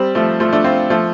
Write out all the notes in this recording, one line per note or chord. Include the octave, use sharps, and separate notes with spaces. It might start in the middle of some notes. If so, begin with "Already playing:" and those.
Already playing: G3 C4
F3 A3
F3 A3
A3 D4
C4 F4
F3 A3